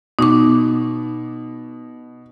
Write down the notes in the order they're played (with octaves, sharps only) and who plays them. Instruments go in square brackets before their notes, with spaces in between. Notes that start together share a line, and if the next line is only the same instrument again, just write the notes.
[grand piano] B2 [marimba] D#4 C#6 D6